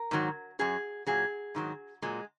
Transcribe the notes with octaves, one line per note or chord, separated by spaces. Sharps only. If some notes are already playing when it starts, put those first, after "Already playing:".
Already playing: A#4
G#2 D#3 F#3
F#2 F#3 G#4
A#2 F#3 G#4
G#2 D#3 F#3
A#2 F#3 G#3